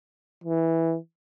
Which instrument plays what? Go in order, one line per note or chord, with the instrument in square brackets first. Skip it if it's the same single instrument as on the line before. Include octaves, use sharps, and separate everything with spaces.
[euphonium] E3